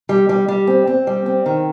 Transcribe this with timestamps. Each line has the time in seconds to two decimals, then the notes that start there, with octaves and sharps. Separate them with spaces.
0.09 G3
0.29 G3
0.48 G3
0.67 C4
0.87 C4
1.07 G3
1.26 C4
1.46 D#3